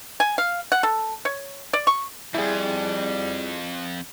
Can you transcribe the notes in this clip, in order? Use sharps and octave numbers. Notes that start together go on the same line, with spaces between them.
G#5
F5
F#5
A4
C#5
D5
C#6
F2 G#2 G3 E4 G#4